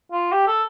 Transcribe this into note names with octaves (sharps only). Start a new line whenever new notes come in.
F4
G4
A4